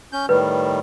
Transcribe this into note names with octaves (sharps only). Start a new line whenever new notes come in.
C#4 G6
A2 D#3 G3 B4